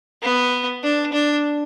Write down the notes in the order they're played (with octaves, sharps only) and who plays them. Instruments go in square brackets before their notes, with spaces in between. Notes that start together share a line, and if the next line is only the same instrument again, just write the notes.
[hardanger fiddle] B3
D4
D4